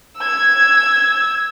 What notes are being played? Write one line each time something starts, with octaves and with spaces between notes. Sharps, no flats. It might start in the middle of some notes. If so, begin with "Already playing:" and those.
E6 G#6